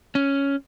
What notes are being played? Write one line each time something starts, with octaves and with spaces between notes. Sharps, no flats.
C#4